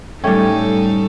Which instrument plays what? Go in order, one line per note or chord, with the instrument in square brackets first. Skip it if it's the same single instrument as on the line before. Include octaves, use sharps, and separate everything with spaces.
[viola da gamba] A2 D#4 A4 [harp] G3 C#4 [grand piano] A3 G5